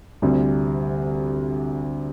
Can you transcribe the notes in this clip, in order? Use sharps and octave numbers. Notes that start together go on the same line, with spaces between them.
D2 C3 G3